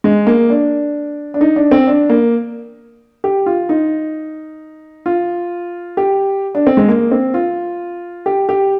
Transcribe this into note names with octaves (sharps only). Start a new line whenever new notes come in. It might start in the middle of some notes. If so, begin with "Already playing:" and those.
G#3
A#3
D4
D4
D#4
D4
C4
D4
A#3
G4
F4
D#4
F4
G4
D4
C4
G#3
A#3
C4
F4
G4
G4